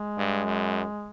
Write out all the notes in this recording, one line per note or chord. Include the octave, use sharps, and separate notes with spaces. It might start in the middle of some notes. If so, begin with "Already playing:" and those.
Already playing: G#3
G2
F#2